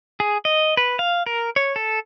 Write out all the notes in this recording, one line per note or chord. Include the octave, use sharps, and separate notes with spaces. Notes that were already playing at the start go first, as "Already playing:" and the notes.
G#4
D#5
B4
F5
A#4
C#5
A4